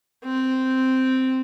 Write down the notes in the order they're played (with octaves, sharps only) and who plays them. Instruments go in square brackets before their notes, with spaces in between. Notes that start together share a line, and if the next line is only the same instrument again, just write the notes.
[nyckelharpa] C4